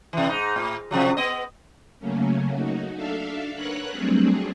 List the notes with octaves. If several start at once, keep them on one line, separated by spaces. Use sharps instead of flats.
C3 E3
G#2 D#4
A2
C3 F3 F#3
B3 D#5
C#3 F#3 A3 A#3 C#4
D#4 F#4
D4 A4 E5 F5
A#4 B4 C#5 F#5 F#6
F#3 G3 A3 C4 D4 G#4